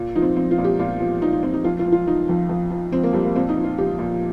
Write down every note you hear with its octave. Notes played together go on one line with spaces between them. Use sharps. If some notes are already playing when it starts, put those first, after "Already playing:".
Already playing: A#2
F3 D#4
C4
F3 C4
F4
A#2
G4
A#2 F4
F3
F3 D#4
D#4
A#2 C4
D#4
F2 F4
F4
F3
F4
F3 D#4
F2
F2
F3
F3 C4
A#3
F2 G3
A#3
A#2 C4
D#4
F3
F4
F3 G4
A#2